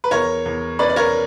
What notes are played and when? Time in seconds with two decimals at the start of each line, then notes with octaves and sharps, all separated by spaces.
0.04 B4
0.11 E2 A#4 C#5
0.46 E2
0.79 C#4 B4 D5
0.90 D5
0.96 A#4 C#5